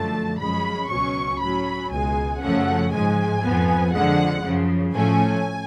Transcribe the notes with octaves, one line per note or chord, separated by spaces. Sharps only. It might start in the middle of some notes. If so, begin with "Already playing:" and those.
Already playing: F#2 D3 F3 A3 A5
F#2 F3 G#3 C#4 B5
C#2 B2 F#3 C#4 C#6
A2 F#3 C#4 B5
C#2 B2 G#3 G#5
F#2 C#3 F3 A3 C#4 F#5
G#2 F3 G#3 G#5
F2 F3 B3
F2 D3 F3 G#3 F#5
F#2 C#3 F3
A2 F3 A3 C#4 G#5